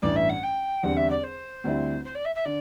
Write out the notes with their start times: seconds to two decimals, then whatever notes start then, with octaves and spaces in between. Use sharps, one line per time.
0.02 A1 G2 E3 G3 D5
0.16 E5
0.29 F#5
0.43 G5
0.83 E2 D3 G3 C4 F#5
0.97 E5
1.10 D5
1.23 C5
1.64 D2 D3 G3 C4 E4
2.05 C5
2.15 D5
2.25 E5
2.35 E5
2.45 D3 D5